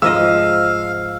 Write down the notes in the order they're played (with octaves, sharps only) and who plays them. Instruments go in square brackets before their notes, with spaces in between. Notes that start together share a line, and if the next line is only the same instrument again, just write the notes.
[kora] G#2 F3 D#5 [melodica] F5 [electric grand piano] E6